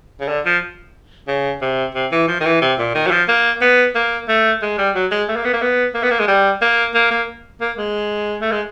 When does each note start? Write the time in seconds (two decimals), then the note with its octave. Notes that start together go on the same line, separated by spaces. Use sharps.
0.21 C#3
0.28 D3
0.46 F3
1.28 C#3
1.62 C3
1.95 C3
2.12 E3
2.28 F3
2.40 D#3
2.45 E3
2.62 C3
2.79 A#2
2.95 D#3
3.07 F#3
3.11 F3
3.28 A#3
3.61 B3
3.95 A#3
4.29 A3
4.62 G#3
4.78 G3
4.95 F#3
5.11 G#3
5.28 A3
5.36 A#3
5.45 B3
5.53 A#3
5.61 B3
5.94 A#3
6.03 B3
6.11 A#3
6.19 G#3
6.28 G3
6.62 A#3
6.95 A#3
7.11 A#3
7.61 A#3
7.78 G#3
8.42 A3
8.52 G#3